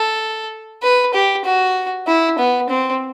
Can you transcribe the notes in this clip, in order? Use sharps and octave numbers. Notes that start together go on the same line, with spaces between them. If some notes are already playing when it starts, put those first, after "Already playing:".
Already playing: A4
B4
G4
F#4
E4
B3
C4